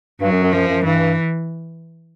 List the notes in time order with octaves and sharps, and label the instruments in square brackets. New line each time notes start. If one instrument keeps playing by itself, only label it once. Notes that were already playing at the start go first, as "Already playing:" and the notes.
[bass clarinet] G2 [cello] F#3
[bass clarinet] F#2
F#2
[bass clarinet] F#2 [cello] F3
[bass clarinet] F#2
[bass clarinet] G2 [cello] E3